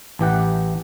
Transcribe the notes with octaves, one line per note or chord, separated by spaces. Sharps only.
A1 E3 G4 F#5